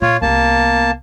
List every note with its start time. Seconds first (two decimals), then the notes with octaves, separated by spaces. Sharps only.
0.02 A#2 F4 C#5
0.22 C2 A#3 B3 A5